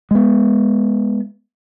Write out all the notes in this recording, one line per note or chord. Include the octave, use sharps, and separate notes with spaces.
G#3 B3